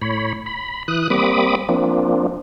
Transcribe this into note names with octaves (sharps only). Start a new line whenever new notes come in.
A2 C#5 B5
B5
E3 D#6 F#6
G3 A#3 C4 B5 D6 D#6
F3 A#3 C4 D4